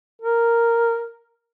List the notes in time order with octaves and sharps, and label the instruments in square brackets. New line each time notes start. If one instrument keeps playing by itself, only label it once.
[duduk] A#4